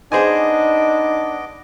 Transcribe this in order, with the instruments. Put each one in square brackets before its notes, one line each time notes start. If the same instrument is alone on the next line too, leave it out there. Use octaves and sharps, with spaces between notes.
[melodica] B3 D#5 D6 [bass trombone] D4 [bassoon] D#4 [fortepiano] G#4 C5 G#5